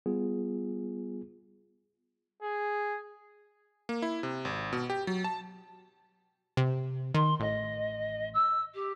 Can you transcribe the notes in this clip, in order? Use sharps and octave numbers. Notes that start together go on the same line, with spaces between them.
G3 B3 F4 G#4
G#4
A#3
E4
C3
G#1
B2
G4
F#3
A5
C3
D#3 C6
A1 D#5
E6
G4